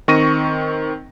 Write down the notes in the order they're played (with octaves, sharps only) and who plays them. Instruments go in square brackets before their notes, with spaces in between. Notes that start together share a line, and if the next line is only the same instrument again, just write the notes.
[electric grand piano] D#3 C4 C#6 A#6 D#7